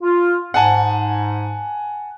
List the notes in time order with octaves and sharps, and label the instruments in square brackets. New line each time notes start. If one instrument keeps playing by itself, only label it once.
[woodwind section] F4
[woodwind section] G#2 [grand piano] F#5 G#5 A5